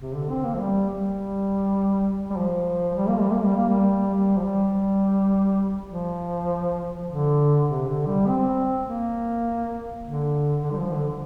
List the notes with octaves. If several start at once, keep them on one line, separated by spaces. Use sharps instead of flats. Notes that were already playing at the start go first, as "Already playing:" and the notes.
C3
D3
C4
A#3
F3
G3
G3
G3
F3
G3
A#3
G3
A#3
G3
A#3
G3
G3
F3
G3
F3
D3
C3
D3
G3
C4
A#3
D3
D3
G3
F3
D3